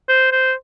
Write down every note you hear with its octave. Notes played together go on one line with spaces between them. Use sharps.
C5
C5